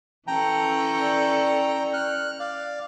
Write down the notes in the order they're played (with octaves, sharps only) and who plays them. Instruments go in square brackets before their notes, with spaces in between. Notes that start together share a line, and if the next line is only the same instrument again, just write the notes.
[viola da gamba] E3 C#4 A4 [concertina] G5 A#5 [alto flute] A5
[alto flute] D5
[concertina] F6 F#6
D5 F5